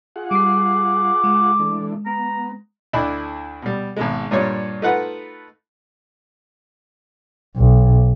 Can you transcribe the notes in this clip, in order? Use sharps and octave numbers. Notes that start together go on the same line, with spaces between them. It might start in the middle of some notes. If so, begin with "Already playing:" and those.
F4 G#4 F#5
G3 D6 C7
G#3
E3 A3 D4
B3 A#5
D2 D4 E4 B5
B2 G3
G#1 B2 G#3
G2 A#2 G3 C#5
A3 D#4 F4 B4 F#5
B1